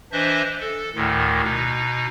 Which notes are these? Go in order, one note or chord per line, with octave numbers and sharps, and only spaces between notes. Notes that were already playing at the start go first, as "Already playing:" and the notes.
E3 D4 C5 D#5 E5
A4
D2 A2 D#3
B2 D#4